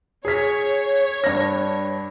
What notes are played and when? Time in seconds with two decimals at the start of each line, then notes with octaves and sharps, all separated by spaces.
0.25 G#4 C#5 B6
1.24 G2 D4 A#6